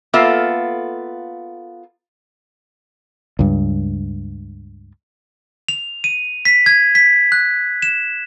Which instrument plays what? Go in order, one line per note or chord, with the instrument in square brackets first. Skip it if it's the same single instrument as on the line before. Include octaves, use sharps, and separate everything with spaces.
[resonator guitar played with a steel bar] A#3 B3 F4 A4 E5 F5
[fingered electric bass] C#2 G2
[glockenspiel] F7
D#7
B6
G#6
B6
F#6
E7